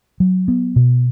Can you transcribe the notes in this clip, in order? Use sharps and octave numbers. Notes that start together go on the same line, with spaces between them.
F#3
B3
B2